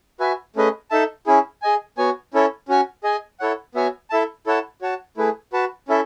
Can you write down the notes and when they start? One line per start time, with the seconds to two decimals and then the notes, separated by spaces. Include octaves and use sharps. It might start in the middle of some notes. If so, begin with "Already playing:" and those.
0.20 F#4 B4 E5 G#5
0.56 A3 C#4 G#4 B4 D#5
0.91 D#4 A4 E5 A5
1.27 C#4 E4 G#4
1.62 G#4 D#5 G#5
1.97 B3 F#4 C#5 G#5
2.34 C#4 E4 A4 C#5
2.68 C#4 F#4 C#5 G#5
3.03 G#4 D#5 G#5
3.40 E4 A4 C#5 F#5
3.75 B3 F#4 C#5 E5 G#5
4.10 E4 A4 E5 A5
4.46 E4 A4 C#5 F#5 A5
4.81 F#4 C#5 F#5 A5
5.17 A3 E4 G#4 B4
5.53 F#4 B4 F#5 A5
5.88 C#4 E4 A4 E5